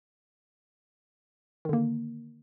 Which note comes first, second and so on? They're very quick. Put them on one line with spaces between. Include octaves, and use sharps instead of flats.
D#3 D3 A#3